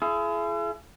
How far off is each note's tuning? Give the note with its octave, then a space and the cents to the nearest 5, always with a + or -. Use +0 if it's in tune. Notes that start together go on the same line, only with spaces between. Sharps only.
E4 +45 G#4 +35